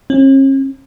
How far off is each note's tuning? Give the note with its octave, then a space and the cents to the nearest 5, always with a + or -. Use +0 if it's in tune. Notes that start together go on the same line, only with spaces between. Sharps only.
C#4 -45